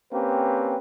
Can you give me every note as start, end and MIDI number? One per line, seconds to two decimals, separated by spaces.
0.13 0.77 58
0.13 0.77 60
0.13 0.77 61
0.13 0.77 67
0.13 0.77 71